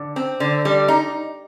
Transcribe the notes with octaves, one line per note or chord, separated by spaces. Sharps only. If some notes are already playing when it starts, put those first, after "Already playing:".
Already playing: D3
C4
D3
G3
D#4